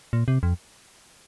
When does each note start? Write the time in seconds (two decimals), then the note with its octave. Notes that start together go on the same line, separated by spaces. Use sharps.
0.13 A#2
0.28 C3
0.43 F2